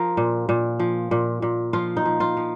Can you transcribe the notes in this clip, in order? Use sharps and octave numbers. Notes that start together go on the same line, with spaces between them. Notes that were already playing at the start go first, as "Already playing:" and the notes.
Already playing: F3 A#4
A#2
A#2
F3
A#2
A#2
F3 F4
D#4
F3
F4
F3